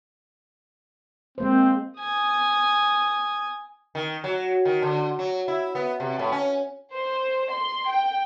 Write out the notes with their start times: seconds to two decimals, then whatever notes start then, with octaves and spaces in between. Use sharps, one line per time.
1.38 G#3 A#3 C4 C5
2.00 G#5 D#6
3.95 D#3
4.24 F#3
4.65 D#3
4.82 D3
5.19 F#3
5.48 E4
5.75 B3
6.00 C3
6.19 A2
6.32 C#4
6.94 C5
7.52 C6
7.89 G5